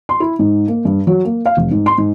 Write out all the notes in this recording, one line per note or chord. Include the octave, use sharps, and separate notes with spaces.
C6
E4
G#2
A#3
G2
F#3
A#3
F5
F1
G#2
C6
G#2